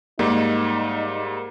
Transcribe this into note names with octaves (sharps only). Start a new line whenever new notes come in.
G#2 G3 A#3 D#4